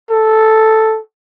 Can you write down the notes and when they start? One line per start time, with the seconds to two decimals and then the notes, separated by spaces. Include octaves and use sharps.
0.10 A4